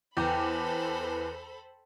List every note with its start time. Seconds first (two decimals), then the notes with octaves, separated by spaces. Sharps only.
0.17 E2 A4 B4 C5 G5 A#5 B5 D6